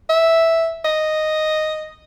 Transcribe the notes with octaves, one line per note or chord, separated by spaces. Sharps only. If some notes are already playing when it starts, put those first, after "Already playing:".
E5
D#5